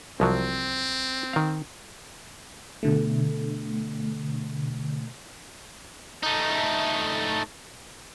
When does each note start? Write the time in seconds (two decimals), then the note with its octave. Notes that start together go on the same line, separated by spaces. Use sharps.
0.20 C2 F3 F#3 C4
1.33 D#3 F5
2.83 B2 D3 A3
6.23 A3 D#4